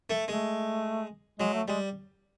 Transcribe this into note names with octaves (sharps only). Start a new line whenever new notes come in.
A3
G#3 A3
F#3 G#3
A3
G3 G#3